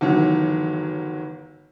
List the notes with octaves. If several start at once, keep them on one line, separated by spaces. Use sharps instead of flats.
G1 D#3 E3 F#3